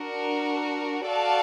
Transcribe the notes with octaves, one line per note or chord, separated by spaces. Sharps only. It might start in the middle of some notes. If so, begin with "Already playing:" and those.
Already playing: D4 F#4 A#4
F#4 A4 D5 F5 A5